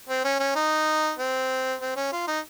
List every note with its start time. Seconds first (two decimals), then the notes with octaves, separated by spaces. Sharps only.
0.09 C4
0.24 C#4
0.40 C#4
0.56 D#4
1.19 C4
1.81 C4
1.96 C#4
2.12 F4
2.28 D#4